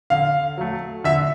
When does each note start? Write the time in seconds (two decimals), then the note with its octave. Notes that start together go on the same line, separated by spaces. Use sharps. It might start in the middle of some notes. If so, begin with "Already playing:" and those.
0.10 D3 F5
0.57 F#3 A3
1.04 D3 E5